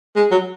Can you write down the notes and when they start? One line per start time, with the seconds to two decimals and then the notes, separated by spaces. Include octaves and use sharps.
0.16 G#3
0.31 F#3